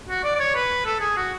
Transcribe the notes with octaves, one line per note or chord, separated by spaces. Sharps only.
F#4
D5
D5
C#5
B4
A4
G#4
F#4